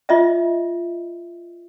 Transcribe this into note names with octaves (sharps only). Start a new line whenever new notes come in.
F4 D#5 E5